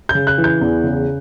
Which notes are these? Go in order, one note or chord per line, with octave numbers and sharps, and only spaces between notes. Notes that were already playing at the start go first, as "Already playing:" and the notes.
G6
C#3
F#6
E3
G6
E2
C#3